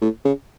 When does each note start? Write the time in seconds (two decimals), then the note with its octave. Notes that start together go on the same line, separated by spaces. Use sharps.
0.02 A2
0.25 C#3